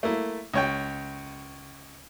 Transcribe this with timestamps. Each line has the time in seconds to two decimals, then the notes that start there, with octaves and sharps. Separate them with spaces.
0.03 A3 A#3 E4
0.54 C#2 C#5 G5